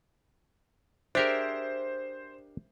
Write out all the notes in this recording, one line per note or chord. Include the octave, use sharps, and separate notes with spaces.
D4 G4 G#4 A#4 C5 E5